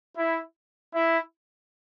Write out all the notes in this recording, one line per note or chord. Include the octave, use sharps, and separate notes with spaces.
E4
E4